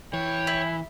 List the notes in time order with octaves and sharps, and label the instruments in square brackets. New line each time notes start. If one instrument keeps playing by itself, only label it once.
[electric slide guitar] E3 [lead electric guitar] C#5 [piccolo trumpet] G5
[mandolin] E4